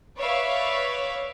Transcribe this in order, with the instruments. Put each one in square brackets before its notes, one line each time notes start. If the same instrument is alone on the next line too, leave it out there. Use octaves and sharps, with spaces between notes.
[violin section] B4 C#5 D5 E5 F5